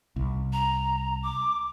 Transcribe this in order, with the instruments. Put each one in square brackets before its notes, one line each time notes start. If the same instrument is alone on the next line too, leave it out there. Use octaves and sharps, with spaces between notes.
[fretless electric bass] C2
[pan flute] A#5
D6